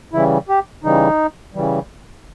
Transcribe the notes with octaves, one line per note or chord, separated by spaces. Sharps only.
C#3 E3 G3 E4
G4
C#3 E3 G3 D#4
C#3 E3 G3